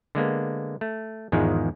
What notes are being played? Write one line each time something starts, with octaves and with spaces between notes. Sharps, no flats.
D3 G#3 A#3 B3
A3
E2 G#2 D#3 F3 G#3